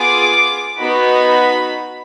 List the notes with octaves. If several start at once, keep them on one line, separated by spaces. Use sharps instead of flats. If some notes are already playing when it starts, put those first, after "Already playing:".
Already playing: B3 F4 G#4 D6
B3 D#4 F#4 B5